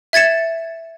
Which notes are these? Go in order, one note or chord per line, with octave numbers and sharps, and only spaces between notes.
E5 G#6 A6 C#7 E7